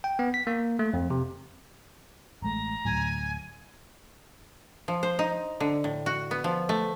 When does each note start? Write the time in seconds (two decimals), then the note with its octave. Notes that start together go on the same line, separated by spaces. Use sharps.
0.04 G5
0.19 B3
0.34 B6
0.47 A#3
0.79 A3
0.94 F2
1.10 C3
2.42 A1 G#3 A3 A#5
2.85 D2 A2 F#3 G#5
4.88 F3
5.03 C5
5.19 D#4
5.60 D3
5.84 A2
6.06 F#4
6.31 B3
6.44 F3
6.69 A3